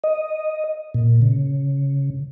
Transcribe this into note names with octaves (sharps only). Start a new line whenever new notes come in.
D#5
A#2
C#3